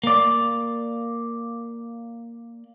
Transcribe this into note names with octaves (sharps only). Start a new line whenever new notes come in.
A#3 D5